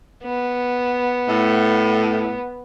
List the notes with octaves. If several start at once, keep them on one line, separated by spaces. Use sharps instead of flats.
B3
A2